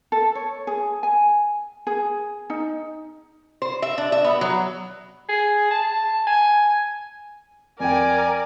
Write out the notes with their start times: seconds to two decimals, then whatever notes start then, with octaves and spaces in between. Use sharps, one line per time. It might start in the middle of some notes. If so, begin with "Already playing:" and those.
0.12 A4
0.35 C#5
0.67 G#4
1.03 G#5
1.87 G#4
2.50 D#4
3.62 C5
3.82 E5
3.98 D4
4.12 E5
4.24 B3
4.41 F#3
5.29 G#4
5.71 A5
6.27 G#5
7.80 F2 A#4 D5 G5 G#5